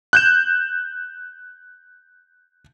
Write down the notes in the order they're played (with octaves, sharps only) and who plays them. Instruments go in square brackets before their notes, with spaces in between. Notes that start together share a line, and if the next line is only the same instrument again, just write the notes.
[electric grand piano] F#6 G6 E7